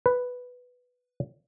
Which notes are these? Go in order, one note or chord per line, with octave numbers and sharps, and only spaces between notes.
B4